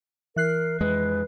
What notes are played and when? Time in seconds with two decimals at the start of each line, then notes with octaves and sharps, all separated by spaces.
0.36 E3 A#4 F#6 C7
0.81 F2 G#3 B4